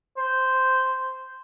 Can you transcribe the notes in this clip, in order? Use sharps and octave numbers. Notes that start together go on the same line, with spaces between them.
C5